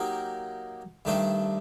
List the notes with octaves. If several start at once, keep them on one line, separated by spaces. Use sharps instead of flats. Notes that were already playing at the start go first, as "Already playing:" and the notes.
Already playing: F#3 A#3 D#4 G4 A#4
G2 D#3 A3 D4 A4